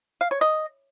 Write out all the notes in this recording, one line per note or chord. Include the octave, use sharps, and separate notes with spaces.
F5
C#5
D#5